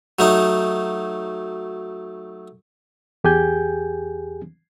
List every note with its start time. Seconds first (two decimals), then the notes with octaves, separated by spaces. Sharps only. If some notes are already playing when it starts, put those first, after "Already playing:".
0.19 F#3 A3 D#4
3.24 E2 G4 G#4 G#5 G6